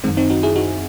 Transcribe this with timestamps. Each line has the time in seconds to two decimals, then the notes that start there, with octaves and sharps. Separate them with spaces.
0.04 F#2 D#3 G#3 C4
0.17 C4 D#4
0.30 D#4 F#4
0.43 E4 G#4
0.56 D#4 F#4